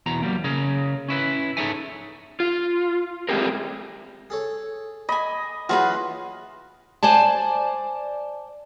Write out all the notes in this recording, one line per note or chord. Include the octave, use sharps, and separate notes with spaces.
E2 B2 A#5
F#3 G3 A#3
C#3 G#4 A#4
C#4 E4 B4
D#4 G#4 A4 C#5 E5 G#5
F4
G#3 A3 C4 G4 G#4 A#4
G#4 A4 C#5
D#5 G#5 B5
E3 F#3 C#4 F4 F#4 G#4 B4
C5 D5 G#5 A5